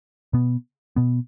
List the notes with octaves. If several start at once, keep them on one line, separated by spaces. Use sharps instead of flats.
B2 B3
B2 B3